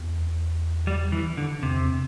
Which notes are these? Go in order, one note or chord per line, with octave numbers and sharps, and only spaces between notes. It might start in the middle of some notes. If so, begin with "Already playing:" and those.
Already playing: E2
G3
E3
D3
E2 C3